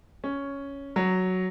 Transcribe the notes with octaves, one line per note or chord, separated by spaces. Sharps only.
C#4
F#3